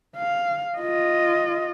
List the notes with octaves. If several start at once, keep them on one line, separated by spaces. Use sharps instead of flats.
F5
F4 D#5